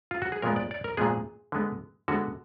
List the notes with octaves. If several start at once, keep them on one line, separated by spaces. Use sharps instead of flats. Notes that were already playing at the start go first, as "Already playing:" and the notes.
F4
F#4
G#4
A#2 F3 G#3 B3 A#4
D5
D5
A#4
A#2 F3 G#3 B3 G#4
D3 G#3 B3
D3 G#3 B3 F#4